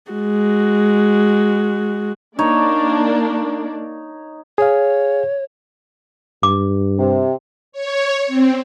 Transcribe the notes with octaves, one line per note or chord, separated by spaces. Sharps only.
G#3 F#4
A#3 D4 D#4 C#5 D5
G#4 C#5 F5
G2 D6
C3
C#5
C4